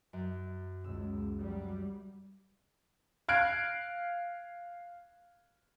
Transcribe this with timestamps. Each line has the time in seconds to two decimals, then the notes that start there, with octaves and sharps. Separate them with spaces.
0.13 F#2
0.84 C#2 E6
1.40 F#3 G3
3.28 F5 F6 F#6 G#6 D7